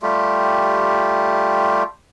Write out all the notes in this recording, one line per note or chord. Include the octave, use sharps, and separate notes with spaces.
G3 A3 F4 G4